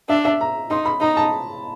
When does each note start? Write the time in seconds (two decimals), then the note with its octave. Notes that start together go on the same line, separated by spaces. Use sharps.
0.09 D4 E5
0.25 E5
0.41 A#5
0.70 D#4 C6
0.86 B5
1.01 D#4 A#5
1.17 A5